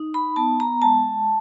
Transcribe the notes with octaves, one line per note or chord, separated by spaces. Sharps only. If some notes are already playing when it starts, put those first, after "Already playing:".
Already playing: D#4
B5
B3 A5
A#5
G#3 A5